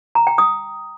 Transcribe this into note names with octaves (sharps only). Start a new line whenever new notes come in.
A#5
G5
D#6